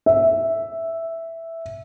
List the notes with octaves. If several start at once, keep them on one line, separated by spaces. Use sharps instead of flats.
E5